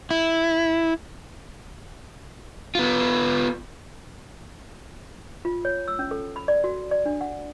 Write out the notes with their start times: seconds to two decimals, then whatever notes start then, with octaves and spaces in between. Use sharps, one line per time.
0.11 E4
2.75 B3 F4
5.45 F4
5.65 C#5
5.88 E6
5.99 C#4
6.11 A4
6.36 B5
6.48 D5
6.64 F#4
6.91 D5
7.06 D4
7.21 F#5